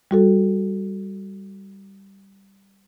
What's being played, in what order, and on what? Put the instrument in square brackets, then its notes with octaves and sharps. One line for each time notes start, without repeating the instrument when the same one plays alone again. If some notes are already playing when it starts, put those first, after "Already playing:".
[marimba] G3 F#4 A4